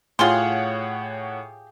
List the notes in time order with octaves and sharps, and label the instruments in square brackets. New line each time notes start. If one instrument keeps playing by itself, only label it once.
[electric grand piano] A2 C#5 F#5 [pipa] F4 C6 [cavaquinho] G4 G#4 F5